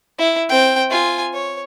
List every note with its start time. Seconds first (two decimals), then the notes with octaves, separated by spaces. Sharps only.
0.18 E4
0.49 C4 G5
0.90 F4 G#5
1.33 C#5